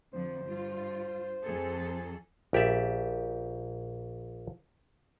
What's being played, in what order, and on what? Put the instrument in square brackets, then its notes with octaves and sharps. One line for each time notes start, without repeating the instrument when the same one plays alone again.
[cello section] F2 D3 F3 [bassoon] C5
[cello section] G2 F4
F2 G#4 A4
[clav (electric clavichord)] A#1 G4 D5 E5